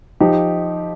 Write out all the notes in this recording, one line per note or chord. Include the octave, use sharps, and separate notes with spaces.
F3 D#4 G4